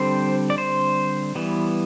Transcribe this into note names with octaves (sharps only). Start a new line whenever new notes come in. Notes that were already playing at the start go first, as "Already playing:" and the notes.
Already playing: D3 G3 C4 C5
D5
C5
E3 G3 B3